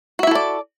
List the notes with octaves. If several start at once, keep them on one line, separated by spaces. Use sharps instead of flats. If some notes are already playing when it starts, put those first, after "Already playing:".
E4 F#4 A4 D5 E5